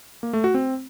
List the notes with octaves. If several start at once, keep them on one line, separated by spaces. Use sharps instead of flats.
A#3
A3
F#4
C4